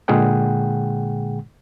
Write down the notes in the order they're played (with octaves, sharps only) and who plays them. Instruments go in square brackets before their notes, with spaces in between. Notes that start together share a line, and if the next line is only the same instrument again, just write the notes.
[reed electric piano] A#2 D3 G#3 G#4 F#5 G5